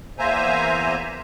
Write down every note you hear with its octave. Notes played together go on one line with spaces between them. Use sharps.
E2 A#3 C5 E5 G#5 A#5